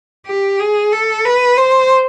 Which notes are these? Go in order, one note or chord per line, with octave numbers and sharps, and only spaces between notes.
G4
G#4
A4
B4
C5